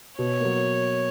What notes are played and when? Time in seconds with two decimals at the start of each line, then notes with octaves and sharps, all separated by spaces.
0.19 B2 C#5
0.40 F#3 A#3